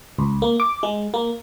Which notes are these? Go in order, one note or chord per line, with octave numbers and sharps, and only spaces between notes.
C#2
A#3
D6
G#3
A#3